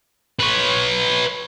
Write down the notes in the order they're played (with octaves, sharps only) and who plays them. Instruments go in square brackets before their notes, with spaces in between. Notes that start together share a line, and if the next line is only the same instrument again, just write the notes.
[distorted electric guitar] B4 C#5